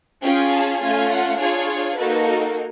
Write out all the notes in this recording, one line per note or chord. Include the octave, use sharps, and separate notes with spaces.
C#4 F4 G#4 G5
A5
A3 C#4 F4 G#5
F#5
D4 F4 G#4 C#5
A#3 D#4 F#4 A4 B4
A#4